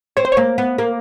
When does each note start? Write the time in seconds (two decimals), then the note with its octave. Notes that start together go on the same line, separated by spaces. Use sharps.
0.17 C4 C#5
0.25 C5
0.32 A#3 C#5
0.58 B3
0.78 A#3